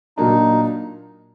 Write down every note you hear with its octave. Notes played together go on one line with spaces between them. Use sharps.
A#2 F#3 A#3 D4 D#4